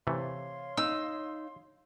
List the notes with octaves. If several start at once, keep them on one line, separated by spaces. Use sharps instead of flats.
C3 E3 A3 C#5 F5 C6
D#4 E6